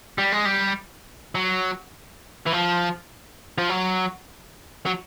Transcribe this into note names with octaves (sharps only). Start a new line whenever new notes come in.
G3
G#3
G3
F#3
E3
F3
F3
F#3
F#3